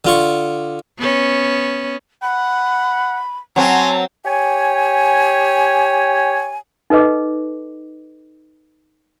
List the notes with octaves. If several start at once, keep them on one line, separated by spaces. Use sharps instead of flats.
D3 F4 C#6
B3 C#4
F#5 B5
F#3 C4 A#4 G#5 A5 C6
G4 C#5 G#5
D#4 A4 B4 D#5 D6